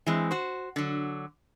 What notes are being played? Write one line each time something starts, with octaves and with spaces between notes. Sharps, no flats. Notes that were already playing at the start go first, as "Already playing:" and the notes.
E3 G#3 C4
F#4 C5
D3 F#3